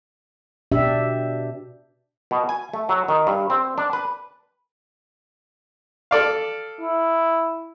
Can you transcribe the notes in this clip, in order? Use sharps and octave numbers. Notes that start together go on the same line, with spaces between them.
B2 D4 G4 E5
B2
G#5
A3
F#3
D#3
G2
C4
D4
B4
A4 D5 F5
E4